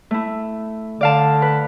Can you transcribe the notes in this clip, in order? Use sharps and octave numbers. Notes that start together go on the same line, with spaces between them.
A3 E4
D3 D5 F5 A5
B4